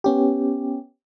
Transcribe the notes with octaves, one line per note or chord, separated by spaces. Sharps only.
B3 C#4 G4